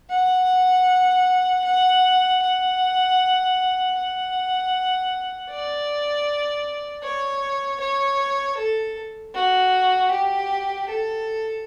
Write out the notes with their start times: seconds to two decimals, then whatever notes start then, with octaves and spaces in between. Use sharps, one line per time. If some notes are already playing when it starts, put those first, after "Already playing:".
0.10 F#5
1.64 F#5
2.42 F#5
3.96 F#5
5.50 D5
7.03 C#5
7.80 C#5
8.58 A4
9.34 F#4
10.11 G4
10.89 A4